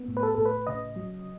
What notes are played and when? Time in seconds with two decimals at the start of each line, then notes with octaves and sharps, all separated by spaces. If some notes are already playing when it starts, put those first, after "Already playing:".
Already playing: B3
0.08 A2
0.17 B4
0.23 A4
0.35 A2 A4
0.46 B4
0.67 C#3 D#5
0.96 F#3